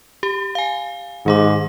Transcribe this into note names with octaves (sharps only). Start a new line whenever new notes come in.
G4
F5 G#5
G#2 D#3 G#4 D6